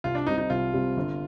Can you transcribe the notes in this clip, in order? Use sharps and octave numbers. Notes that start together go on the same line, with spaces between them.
C2 F4
D4
C3 G3 C4 D#4
D#4
C2 F4
C3 G3 C4
G1